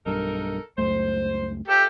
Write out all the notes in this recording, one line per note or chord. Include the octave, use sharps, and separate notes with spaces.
B1 G2 D#4 A4 A#4
C#2 F#2 A3 C5
C3 F3 G4 A4